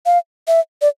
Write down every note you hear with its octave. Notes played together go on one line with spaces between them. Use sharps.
F5
E5
D5